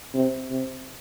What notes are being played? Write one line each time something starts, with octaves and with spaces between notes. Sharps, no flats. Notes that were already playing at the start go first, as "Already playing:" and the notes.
C3
C3